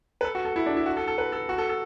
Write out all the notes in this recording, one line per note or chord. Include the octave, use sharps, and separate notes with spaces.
B4
A4
F#4
A4
E4
D4
E4
F#4
A4
A4
B4
A4
F#4
A4
A4